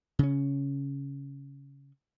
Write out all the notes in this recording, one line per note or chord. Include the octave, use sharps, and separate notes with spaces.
C#3 C#4